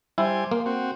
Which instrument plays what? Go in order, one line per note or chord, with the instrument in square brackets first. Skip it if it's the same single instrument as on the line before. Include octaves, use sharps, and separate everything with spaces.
[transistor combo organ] G3 C5 G#5 [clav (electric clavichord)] E4
[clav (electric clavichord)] A#3 [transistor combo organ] C6
[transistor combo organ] C4 F#4